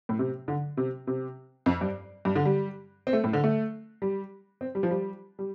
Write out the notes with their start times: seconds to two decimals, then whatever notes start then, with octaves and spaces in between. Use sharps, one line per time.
0.09 A2
0.19 C3
0.48 D3
0.77 C3
1.07 C3
1.66 F2
1.81 G2
2.25 G2
2.35 D3
2.45 G3
3.07 C4
3.13 A3
3.24 A2
3.33 D3
3.44 A3
4.02 G3
4.61 C4
4.75 G3
4.83 F3
4.91 G3
5.39 G3